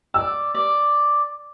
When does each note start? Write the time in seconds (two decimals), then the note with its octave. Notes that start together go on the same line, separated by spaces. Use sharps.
0.14 D5 E6
0.54 D5